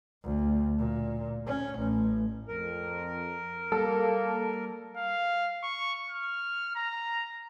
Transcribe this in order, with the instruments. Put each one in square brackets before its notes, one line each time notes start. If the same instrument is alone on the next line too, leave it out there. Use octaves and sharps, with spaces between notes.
[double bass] D2
A#2
C#4
A1
[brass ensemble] F2 [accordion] A#4
[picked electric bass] G3 [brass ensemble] A#3 [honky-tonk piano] A4
[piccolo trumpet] F5
C#6
F6
A#5